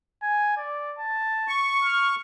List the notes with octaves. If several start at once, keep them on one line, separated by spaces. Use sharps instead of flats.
G#5
D5
A5
C#6
F6